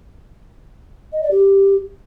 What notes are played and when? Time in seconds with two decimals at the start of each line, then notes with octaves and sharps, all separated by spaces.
1.13 D#5
1.22 D5
1.31 G4